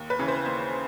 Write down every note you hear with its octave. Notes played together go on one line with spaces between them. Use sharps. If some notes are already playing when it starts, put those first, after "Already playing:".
Already playing: D#2
B4
C#3 E3
C5
D#2